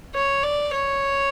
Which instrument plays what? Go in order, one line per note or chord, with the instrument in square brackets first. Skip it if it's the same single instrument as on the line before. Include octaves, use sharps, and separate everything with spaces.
[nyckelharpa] C#5
D5
C#5